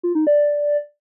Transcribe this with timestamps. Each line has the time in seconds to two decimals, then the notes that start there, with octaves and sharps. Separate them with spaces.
0.03 F4
0.15 D#4
0.27 D5